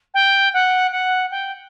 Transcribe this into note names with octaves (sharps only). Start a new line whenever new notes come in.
G5
F#5
F#5
G5